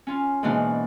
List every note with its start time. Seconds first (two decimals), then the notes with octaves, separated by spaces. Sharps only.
0.07 C#4 F4
0.43 G#2 B2 E3 A#3 D4 F#4